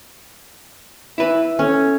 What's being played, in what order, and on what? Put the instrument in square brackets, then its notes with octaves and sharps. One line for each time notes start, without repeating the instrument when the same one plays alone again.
[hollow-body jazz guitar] E4 B4 [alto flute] E5
[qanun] C#4 [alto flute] A4